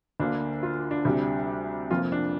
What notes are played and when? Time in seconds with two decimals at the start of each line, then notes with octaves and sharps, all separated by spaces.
0.20 D2 D3 A#3 D4
0.63 F4
0.91 D4
1.05 D2 C3 G3
1.90 F1 F2 F3 A#3 F4
2.12 D4